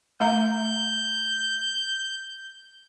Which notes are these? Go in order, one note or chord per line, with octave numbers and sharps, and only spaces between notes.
A3 E5 A#5 G6